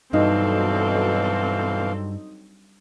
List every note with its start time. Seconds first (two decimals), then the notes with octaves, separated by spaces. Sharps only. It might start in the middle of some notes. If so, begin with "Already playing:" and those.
0.13 G2 B2 E3 F#3 C4 D#4 A4 F5